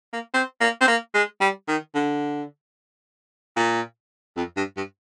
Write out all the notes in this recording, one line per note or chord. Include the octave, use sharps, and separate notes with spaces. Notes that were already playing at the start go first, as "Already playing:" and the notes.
A#3
C4
A#3
C4
A#3
G#3
G3
D#3
D3
A#2
F2
G2
G2